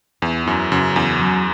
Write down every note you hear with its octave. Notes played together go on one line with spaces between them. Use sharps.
E2 E4
F#2 E4
F#2 C#3
E2 C#4
F#3